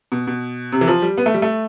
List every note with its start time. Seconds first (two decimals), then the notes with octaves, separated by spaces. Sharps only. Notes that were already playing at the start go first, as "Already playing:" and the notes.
0.12 B2
0.27 B2
0.72 C3
0.81 E3
0.88 F3
1.02 G3
1.18 B3
1.26 A3
1.34 G3
1.42 A3